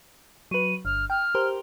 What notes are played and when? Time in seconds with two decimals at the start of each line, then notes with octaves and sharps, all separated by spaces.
0.51 F#3 B4 D#7
0.85 G1 F6
1.10 G5 F6
1.35 G4 A#4 C5